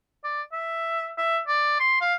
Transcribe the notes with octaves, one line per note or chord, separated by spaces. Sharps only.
D5
E5
E5
D5
C6
F5